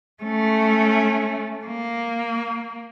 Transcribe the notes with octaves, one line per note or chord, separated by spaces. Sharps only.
A3 C#4
A#3